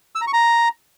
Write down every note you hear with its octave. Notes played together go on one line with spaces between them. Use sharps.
E6
A#5
C#6
A#5